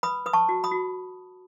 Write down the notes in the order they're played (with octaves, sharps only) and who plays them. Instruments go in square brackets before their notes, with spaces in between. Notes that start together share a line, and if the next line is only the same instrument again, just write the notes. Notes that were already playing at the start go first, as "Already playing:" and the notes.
[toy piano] B4 B5 D#6
B4 D#6
A5 C#6
F#4
B5 D#6
F#4